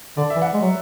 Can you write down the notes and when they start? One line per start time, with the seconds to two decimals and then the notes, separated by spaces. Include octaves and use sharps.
0.17 D3 D5
0.30 E5
0.36 E3
0.42 F#5
0.54 G#3
0.62 F#3